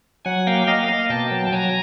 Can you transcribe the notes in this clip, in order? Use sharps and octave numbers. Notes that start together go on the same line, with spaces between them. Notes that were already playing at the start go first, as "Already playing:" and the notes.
F#3 F#5 G#5
A#3 F5 G5
A#3 D#5 F5
A#3 D#5 F5
B2 G5 A5
F#3
A5
F#3 G#5 A#5